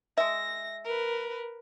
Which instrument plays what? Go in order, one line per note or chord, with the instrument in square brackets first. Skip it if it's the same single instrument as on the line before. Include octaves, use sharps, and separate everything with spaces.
[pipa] G#3 E5 [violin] A#6
[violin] A#4 B4